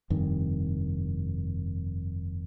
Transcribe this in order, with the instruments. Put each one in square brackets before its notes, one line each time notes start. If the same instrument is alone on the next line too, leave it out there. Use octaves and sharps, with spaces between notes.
[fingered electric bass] F1 G2 C3 D#3